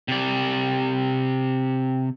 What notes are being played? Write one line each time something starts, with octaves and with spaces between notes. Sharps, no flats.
C3 D5